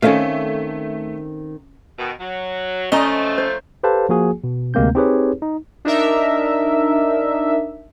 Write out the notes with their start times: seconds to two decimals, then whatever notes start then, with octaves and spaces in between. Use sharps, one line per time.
0.02 D#3 A3 C4 C#4 A4 D#5 F5
1.99 B2 D#3
2.20 F#3
2.92 F3 A3 C#4 D#5 A#5
3.38 C5
3.83 G4 A4 B4 C5 F5 A5
4.09 F3 A#3 F#4 G#4 G#5
4.44 B2
4.74 D2 C3 G#3 A#3 C4 G6
4.95 C4 D#4 G4 G#4 B4 C#5
5.42 D#4
5.85 D4 D#4 A#4 E5